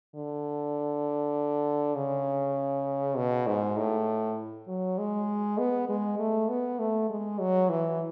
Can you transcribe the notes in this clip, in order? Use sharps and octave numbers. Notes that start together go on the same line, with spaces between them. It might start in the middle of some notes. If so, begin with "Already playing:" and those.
D3
C#3
B2
G#2
A2
F#3
G#3
B3
G#3
A3
B3
A3
G#3
F#3
E3